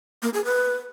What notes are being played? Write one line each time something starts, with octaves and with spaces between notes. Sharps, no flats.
A#3
G#4
B4